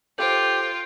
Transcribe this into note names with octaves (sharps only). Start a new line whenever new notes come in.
F4 G4 A4 C5 G6 D7